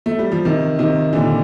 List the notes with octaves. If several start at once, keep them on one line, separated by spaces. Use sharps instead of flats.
A3
G3
F3
C3 D#3
C3 D#3
A#2 D3